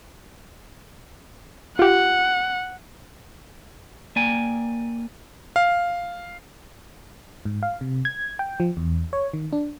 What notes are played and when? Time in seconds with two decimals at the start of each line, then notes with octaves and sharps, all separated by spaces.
1.79 F4 G4 F#5
4.16 A#3 D5 G5 G#5
5.56 F5
7.45 G#2
7.63 F5
7.81 C3
8.05 G#6
8.39 G5
8.60 F3
8.77 E2
9.13 C#5
9.34 D#3
9.53 D4